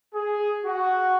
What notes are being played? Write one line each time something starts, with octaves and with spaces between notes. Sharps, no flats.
G#4
F#4